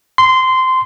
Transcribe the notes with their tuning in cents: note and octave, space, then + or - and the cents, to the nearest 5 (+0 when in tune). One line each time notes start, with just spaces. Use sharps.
C6 -15